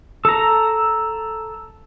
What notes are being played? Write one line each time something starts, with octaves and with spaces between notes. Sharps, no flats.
A4 A#5